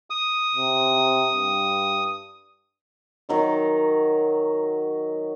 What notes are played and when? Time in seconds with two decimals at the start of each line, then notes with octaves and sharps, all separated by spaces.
0.10 D#6
0.55 C3
1.33 G2
3.29 D#3 F#3 D#5